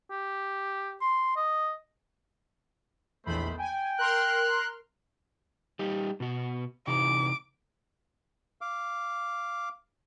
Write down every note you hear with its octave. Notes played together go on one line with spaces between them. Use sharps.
G4
C6
D#5
A#1 E2 D#3 A3 C5 B5
G5 G#5
A#4 C6 F6 F#6
G3 D#4 G4
B2 F#4
C3 E3 D#4 D6
F5 D6